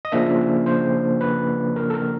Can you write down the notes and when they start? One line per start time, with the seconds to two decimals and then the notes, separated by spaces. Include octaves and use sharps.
0.05 D#5
0.12 C#3 F3 A#3 D4 E5
0.66 C5
1.21 B4
1.76 A#4
1.90 A4
1.94 A#4